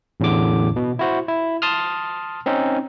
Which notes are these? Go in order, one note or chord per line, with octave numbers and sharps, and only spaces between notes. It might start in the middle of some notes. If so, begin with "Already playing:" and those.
A1 E2 A2 D3 D6
B2
E4 F#4 C5
E4
A5 C6 D#6 F6
C4 C#4 D#4